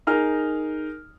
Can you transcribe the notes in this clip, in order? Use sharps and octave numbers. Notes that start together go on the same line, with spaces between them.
D#4 G#4 A#4 F6